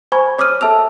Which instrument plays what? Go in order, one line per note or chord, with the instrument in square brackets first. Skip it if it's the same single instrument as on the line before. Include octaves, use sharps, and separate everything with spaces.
[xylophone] C5 G#5 B5 C#6 G#6
C#5 D6 D#6 F6 D#7
A4 E5 A5 E6 F7